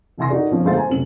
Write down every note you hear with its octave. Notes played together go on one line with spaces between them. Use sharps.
F1 E3 E5 G#5 C6 A#6
D#4 F#4 A4 A#4 D5
F2 B2 F3 C#4
G1 G#3 A3 C5 F5 A6
C5 G#5 A#5
F#2 C3 A3 C#4 F#7